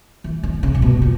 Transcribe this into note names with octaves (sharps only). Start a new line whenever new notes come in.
E3
D#3
C#3
A#2
B2
A#2